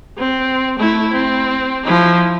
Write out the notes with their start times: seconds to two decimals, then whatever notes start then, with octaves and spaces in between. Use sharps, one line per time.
0.18 C4
0.78 A3 E4
1.12 C4
1.84 F3 E4